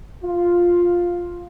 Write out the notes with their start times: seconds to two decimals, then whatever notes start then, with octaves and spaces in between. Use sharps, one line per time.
0.23 F4